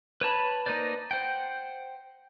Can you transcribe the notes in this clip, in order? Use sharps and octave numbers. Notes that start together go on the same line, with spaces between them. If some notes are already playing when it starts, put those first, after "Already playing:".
B4 C#5 A5 B5
A#3 D#4 B4 C5 D5
C5 F#5 G5